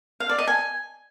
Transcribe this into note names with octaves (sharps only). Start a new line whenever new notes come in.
F5
D5
D#5
G#5